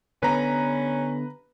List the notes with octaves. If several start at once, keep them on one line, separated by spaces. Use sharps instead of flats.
D3 B3 C#4 B4 A#5